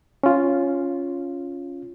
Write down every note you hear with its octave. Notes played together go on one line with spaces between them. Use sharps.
C#4 F4